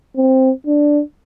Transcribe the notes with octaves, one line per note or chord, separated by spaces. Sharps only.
C4
D4